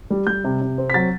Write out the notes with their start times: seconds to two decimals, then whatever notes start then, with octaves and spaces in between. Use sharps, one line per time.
0.10 G3
0.27 G3 G6
0.44 C3
0.62 C3
0.78 C4
0.90 B6
0.94 F#3 A6